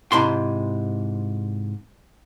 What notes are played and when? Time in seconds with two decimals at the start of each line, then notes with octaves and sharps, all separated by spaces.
0.12 G#2 C3 E4 A5 A#5 C6